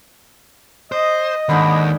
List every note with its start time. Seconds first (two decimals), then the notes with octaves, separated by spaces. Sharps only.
0.92 C5 D#5
1.49 D#2 G#2 D3 B5